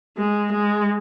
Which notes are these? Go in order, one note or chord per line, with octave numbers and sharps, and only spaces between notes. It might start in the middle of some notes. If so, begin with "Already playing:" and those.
G#3
G#3